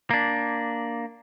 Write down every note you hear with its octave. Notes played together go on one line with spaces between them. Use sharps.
A#3 D4